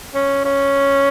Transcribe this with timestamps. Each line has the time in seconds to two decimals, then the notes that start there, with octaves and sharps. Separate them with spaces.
0.15 C#4
0.45 C#4